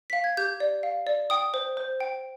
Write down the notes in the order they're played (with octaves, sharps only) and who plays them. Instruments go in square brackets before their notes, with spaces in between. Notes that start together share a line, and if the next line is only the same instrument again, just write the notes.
[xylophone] F5 B6
G#6
G4 G6
D5
F5
D5
G5 D#6
C5
C5
G5